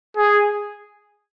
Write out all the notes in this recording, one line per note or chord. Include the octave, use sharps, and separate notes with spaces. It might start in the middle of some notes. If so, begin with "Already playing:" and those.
G#4